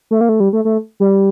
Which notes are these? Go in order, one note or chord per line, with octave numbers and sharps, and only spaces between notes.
A3
A#3
A3
G3
A3
A3
G3